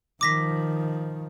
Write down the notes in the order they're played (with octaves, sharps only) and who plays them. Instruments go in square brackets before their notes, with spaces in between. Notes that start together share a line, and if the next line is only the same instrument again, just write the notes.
[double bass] D#3 F3 [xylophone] D6 A#6 B6